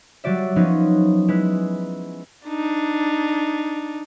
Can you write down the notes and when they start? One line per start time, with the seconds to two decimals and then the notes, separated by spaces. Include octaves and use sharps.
0.24 F#3 G3 F#4 D5 E5
0.56 F3 F#3 B3 C#4 D#4
1.28 G#3 E4 B4
2.47 D4 D#4